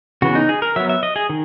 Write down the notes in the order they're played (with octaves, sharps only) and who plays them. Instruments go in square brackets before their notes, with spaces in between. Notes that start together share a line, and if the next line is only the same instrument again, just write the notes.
[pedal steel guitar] C#3 E3 B3 F#4
D#4
G#4
A#4
F#3 B3 E5
E5
D#5
G#4
D#3